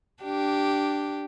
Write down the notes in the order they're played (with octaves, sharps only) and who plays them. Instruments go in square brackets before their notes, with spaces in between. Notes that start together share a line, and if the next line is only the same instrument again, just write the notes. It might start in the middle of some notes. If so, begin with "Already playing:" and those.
[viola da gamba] D4 G4